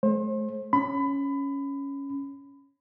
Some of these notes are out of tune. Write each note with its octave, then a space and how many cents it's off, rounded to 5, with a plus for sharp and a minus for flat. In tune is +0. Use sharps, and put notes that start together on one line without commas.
A3 -45 C5 +35
C#4 +0 B5 +25